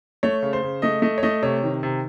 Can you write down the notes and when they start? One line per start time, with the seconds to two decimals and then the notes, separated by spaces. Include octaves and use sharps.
0.23 A3 C#5
0.42 C#3
0.53 C5
0.63 C#3
0.82 A3 D#5
1.02 A3 D#5
1.18 C#5
1.23 A3 D#5
1.42 C3 C#5
1.63 D#3
1.83 C3